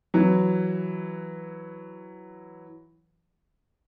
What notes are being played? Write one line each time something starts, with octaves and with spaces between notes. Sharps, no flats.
E3 F#3